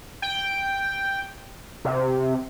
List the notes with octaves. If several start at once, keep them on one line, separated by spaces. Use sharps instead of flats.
G5
C3